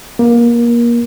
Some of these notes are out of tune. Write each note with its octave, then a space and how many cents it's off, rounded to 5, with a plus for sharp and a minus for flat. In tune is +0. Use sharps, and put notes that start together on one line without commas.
A#3 +25